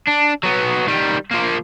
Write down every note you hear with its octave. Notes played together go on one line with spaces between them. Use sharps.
D4
F#3 B3
D#3 G3
F3 A#3